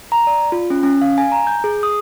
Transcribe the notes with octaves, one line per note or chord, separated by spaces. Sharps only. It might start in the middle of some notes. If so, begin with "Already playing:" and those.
A#5
D5
F4
C#4
C#4
F5
G#5
A#5
G6
G#4
D#6